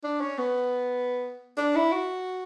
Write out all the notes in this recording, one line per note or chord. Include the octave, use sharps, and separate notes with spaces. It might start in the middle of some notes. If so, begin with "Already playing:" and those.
D4
C#4
B3
D4
E4
F#4